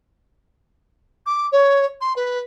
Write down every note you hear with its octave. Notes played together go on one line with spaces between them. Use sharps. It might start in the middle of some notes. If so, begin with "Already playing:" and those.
D6
C#5
C6
B4